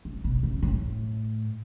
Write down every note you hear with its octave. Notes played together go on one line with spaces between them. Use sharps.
A2
B2
C#3
A2